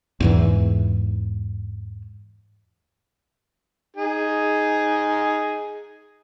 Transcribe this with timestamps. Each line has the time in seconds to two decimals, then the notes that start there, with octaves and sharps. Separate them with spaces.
0.20 E2 G#2 E3
3.97 D#4 G#4